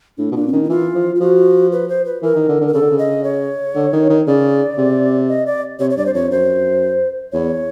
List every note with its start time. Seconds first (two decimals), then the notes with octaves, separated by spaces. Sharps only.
0.18 A2 D4
0.31 B2
0.35 A#2 D4
0.48 C4
0.53 D#3 C#4
0.64 E4
0.69 E3 F4
0.95 F3
1.15 F4
1.20 F3 F#4
1.72 B4
1.89 C5
2.05 B4
2.22 E3 A#4
2.35 D#3
2.48 D3
2.61 D3
2.68 A#4
2.73 C#3 A4
2.81 D3
2.91 C#3
2.99 D#5
3.24 C#5
3.75 D3
3.93 D#3
4.09 D#3
4.27 C#3 D5
4.77 C3
5.29 D#5
5.46 D5
5.80 C3 C#5
5.90 C#5
5.97 G2 D5
6.06 C5
6.14 F2 C#5
6.30 F#2 C5
7.32 E2 C#5